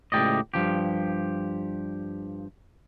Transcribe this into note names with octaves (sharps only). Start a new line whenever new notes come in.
C#2 A2 A3 G4 D5 D#5
G2 F3 G4